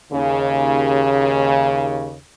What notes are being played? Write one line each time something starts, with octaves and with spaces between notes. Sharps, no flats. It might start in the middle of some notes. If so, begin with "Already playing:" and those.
D#2 C#3